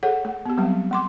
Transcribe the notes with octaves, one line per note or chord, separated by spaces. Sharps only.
G#4 A4 C#5 F#5
A3
B3 G4
F#3 G3 A3 C4 G4
A3 C6 D6